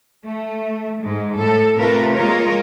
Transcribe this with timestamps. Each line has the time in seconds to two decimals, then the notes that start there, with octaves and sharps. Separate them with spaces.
0.24 A3
1.01 G#2 G#3
1.37 A2 A4
1.79 C3 A3 F4 A#4 B4
2.14 G#3 A#3 F4 A#4 C#5